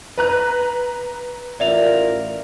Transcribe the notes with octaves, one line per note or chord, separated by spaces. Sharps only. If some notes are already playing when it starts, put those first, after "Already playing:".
B4 A#5 F#6
A1 F4 A#4 D5 E5 F7